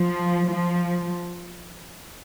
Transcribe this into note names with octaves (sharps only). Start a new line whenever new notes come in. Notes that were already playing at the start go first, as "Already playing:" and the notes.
Already playing: F3
F3